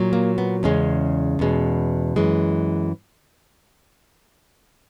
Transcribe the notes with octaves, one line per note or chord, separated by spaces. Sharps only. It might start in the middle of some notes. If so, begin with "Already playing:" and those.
Already playing: A#2 F#3
A#3
B3
E2 C#3 G#3 C#4
E2 B2 G#3
F#2 E3 G#3